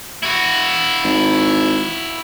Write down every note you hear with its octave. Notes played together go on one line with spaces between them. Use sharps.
E4 F#4
G#1